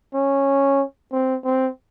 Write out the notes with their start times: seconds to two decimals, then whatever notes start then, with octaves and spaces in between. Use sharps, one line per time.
0.14 C#4
1.12 C4
1.45 C4